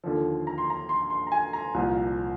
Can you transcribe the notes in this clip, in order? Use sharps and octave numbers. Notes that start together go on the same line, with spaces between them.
D#2 D3 F3
A#5
C6
A#5
C6
C6
A#5
G#5
A#5
C2 A#2 F3